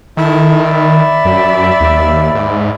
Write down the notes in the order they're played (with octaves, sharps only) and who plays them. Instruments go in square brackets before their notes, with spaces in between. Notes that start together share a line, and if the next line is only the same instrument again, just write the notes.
[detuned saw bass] D#3 [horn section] E4 A4
[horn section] D5 E5 B5
[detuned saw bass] F#2
D#2
G#2